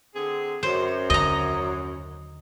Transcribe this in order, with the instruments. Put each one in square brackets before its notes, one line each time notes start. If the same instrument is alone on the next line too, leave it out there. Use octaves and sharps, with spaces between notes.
[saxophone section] D3 C4 G#4
[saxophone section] F#2 [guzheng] C5
[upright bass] D#2 D3 [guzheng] D#5 A#5